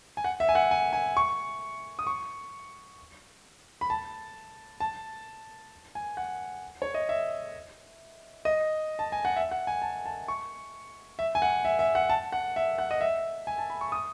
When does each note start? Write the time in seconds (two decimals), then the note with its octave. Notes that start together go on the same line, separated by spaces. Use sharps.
0.17 G#5
0.24 F#5
0.40 E5
0.49 G#5
0.55 F#5
0.71 G#5
0.93 G#5
1.17 C#6
1.99 D#6
2.07 C#6
3.81 B5
3.90 A5
4.80 A5
5.95 G#5
6.17 F#5
6.82 C#5
6.94 D#5
7.09 E5
8.45 D#5
8.99 A5
9.12 G#5
9.25 F#5
9.36 E5
9.51 F#5
9.67 G#5
9.82 A5
10.06 A5
10.28 C#6
11.19 E5
11.35 G#5
11.42 F#5
11.65 E5
11.79 E5
11.95 F#5
12.10 A5
12.32 F#5
12.56 E5
12.78 F#5
12.91 D#5
13.01 E5
13.47 G#5
13.58 A5
13.70 B5
13.81 C#6
13.92 D#6